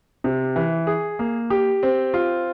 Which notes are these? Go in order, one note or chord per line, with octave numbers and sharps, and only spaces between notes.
C3
E3
G#4
A#3
G4
C4
F4